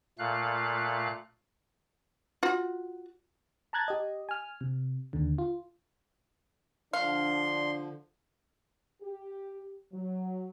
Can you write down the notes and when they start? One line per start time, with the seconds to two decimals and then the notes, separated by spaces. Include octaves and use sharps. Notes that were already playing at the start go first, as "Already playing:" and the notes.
0.19 A#2 A3 F5 F#6
2.43 F4 F#4
3.73 A5 A#5 F#6 G#6 A6
3.88 G4 D#5
4.29 G#5 F6
4.61 C3
5.13 D#2 D3
5.38 F4
6.93 D3 F3 D4 F5 C6
9.02 G4
9.93 F#3